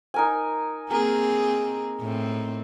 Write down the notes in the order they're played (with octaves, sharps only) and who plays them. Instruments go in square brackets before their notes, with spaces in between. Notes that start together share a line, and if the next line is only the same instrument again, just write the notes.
[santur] D#4 A#4 G#5
[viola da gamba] A#3 C4 G#4 [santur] A#4
[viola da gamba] A2 C4